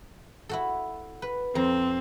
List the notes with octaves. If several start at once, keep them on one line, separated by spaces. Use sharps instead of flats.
E4 F#4 A4
B4
F2 C4 A#5